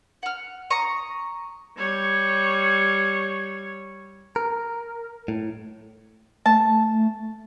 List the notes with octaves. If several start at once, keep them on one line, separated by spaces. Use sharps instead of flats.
F#5 F6
A#5 C#6 D#6
G3 C#5
A#4
A2
A3 A5